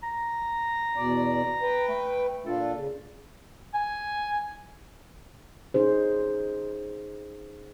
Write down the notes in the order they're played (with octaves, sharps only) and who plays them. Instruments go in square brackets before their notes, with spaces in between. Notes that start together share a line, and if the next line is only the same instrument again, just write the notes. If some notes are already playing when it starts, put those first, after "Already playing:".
[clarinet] A#5
[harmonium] E2 B2 D5
B4 G5
[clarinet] A3
[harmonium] A#2 D4 F4 [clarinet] A4
[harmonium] C#3
[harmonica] G#5
[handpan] C#4 D#4 G#4 C5